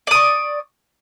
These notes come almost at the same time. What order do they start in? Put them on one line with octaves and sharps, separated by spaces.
D5 D#6 C#6